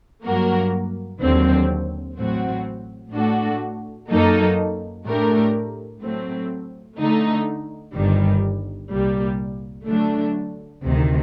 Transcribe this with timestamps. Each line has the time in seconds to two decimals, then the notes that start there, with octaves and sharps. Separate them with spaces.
0.25 G2 F#3 A#3 F#4 A#4
1.21 D#2 D3 F#3 C4
2.17 A1 A2 F#3 C4 F#4
3.13 A2 A3 D4 F#4 A4
4.10 F#2 F#3 A#3 D#4 A4
5.05 A2 A3 D4 G4 A#4
6.02 A2 F#3 A3 C4
6.99 D3 A3 D#4
7.95 G1 G2 D#3 G3
8.91 C2 A#2 G3 A#3
9.87 D3 F#3 A3 D4
10.84 D2 C3 D#3